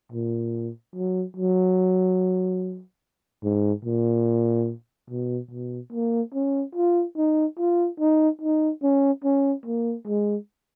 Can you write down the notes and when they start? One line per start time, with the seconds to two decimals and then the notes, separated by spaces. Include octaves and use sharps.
0.12 A#2
0.96 F#3
1.36 F#3
3.44 G#2
3.85 A#2
5.10 B2
5.51 B2
5.93 A#3
6.34 C#4
6.75 F4
7.17 D#4
7.59 F4
8.00 D#4
8.42 D#4
8.83 C#4
9.24 C#4
9.66 A#3
10.07 G#3